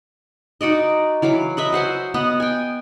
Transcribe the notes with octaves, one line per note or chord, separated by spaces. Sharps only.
D#4 F#4 D5 D#5
E3 F#3 F5 D6
B4 D#5 E5 B5
F#4 C5 F#5 G#5
B3 D#5 F#5
G5 G#5